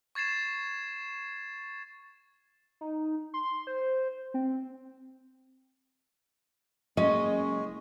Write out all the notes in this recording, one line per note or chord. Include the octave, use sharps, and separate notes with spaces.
C#6 G#6 A6 C7 E7
D#4
C6
C5
C4
F#1 G#3 C#4 D#5